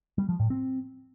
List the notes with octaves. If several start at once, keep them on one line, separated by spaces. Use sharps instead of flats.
G3
F3
A2
C4